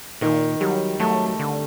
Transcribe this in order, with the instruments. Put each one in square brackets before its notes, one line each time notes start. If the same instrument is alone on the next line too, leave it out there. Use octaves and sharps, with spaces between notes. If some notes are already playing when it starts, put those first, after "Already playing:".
[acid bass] A#2 [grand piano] D#3
[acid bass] F#3 [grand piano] G3
[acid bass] F#3 [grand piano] A3
[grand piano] A3
[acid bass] D3